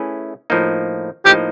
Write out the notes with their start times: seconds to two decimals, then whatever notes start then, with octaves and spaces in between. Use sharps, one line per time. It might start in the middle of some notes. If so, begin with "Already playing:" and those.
Already playing: A3 C#4 E4 G#4 B4
0.50 A2 F3 A#3 D#4
1.25 A2 F3 A#3 D#4 G4